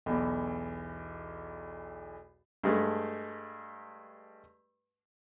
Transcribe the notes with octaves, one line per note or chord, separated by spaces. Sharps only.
B1 E2
G2 G#3 A3